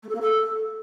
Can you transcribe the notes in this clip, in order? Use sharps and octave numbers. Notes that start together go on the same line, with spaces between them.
A3
A4
A#3
A4